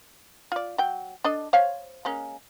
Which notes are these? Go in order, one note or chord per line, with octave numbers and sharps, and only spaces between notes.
F4 D5
F#3 G5
D4 A4 D#5
C5 C#5 F5
G#3 A#3 C#4